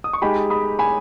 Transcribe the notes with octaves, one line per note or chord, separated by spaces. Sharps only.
D#6
C#6
G#3 D#4 G4 G#5 B5
B5 D#6
G#5 B5